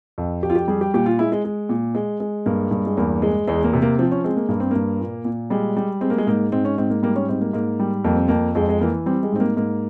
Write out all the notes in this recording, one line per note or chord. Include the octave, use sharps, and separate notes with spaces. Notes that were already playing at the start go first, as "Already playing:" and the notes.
F2
F2 G4
F4
G4
G3 G#4
G4
A#2 G4
F4
G#3 E4
G#3
G#3
A#2
G#3
G#3
G2 A#3
G2
G#3
E2 A#3
G#3
E2 G#3
A#3
C3
A#3
F3 C4
C#4
G#3 C4
A#3
G2 A#3
C4
G2 A#3
A#2
A#2
G3 G#3
G3
G#3 C4
A#3
G#3
G#2 A#3
G#2 C4
C#4
G#2 C4
A#3
G3 A#3
C#4
G#2 C4
A#3
G#2 A#3
G3
F2 A#3
C4
F2 A#3
F2 G#3
G#3
E3 A#3
G3 C4
G#3
G#2 C4
A#3
G#2 A#3